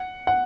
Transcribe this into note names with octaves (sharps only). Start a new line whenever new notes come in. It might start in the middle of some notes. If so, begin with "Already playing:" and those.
Already playing: F#5
F#5